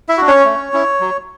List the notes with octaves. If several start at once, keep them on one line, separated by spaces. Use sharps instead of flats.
E4 E5
D4 F#4
C#4 C#5
A3
C#4 E4
F#3